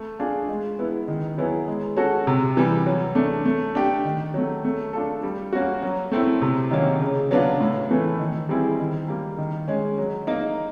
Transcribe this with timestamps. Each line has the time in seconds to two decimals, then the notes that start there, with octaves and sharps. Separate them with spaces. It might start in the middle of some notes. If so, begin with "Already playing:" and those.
Already playing: A3
0.19 D4 F4 G#4
0.48 G#3
0.79 B3 E4
1.08 D#3
1.38 F#3 B3 E4 G#4
1.68 G#3
1.97 C#4 F#4 A4
2.27 C3
2.57 E3 G3
2.86 F#3
3.15 A3 D4
3.45 A3
3.75 D4 G4
4.05 D#3
4.34 F#3 A3
4.64 A3
4.93 D4 F4 A4
5.23 G3
5.53 A#3 C#4 F#4
5.82 F#3
6.12 A3 C4 E4
6.42 C3
6.71 D#3 F#3 A#3 C#4
7.01 C#3
7.31 F#3 B3 D4 F4
7.61 A2
7.91 E3 A3
8.19 D#3
8.49 G3 C4 E4 G#4
8.80 D#3
9.08 G3 A#3
9.38 D#3
9.68 G#3 C#4
9.98 F#3
10.27 A#3 D#4